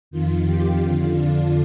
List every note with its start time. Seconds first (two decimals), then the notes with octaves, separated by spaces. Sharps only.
0.11 F2 D#3 F4
0.45 G4
0.79 F2 D3 F4
1.12 D4